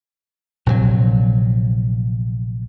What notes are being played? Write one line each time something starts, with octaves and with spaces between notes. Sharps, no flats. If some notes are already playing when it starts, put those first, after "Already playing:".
A#1 C3 E3 F#3